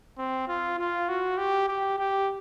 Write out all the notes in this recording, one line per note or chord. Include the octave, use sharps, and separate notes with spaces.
C4
F4
F4
F#4
G4
G4
G4